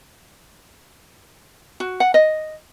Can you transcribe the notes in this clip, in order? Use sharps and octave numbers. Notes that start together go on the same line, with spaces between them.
F#4
F#5
D#5